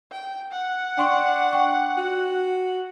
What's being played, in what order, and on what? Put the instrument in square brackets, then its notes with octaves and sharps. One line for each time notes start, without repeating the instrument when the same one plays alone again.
[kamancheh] G5
F#5
[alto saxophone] D4 [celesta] G5 C6 C#6
[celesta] G5 C#6
[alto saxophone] F#4